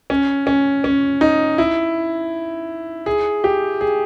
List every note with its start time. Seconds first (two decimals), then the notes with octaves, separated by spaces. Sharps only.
0.10 C#4
0.47 C#4
0.84 C#4
1.21 D#4
1.58 E4
3.06 G#4
3.44 G4
3.81 G#4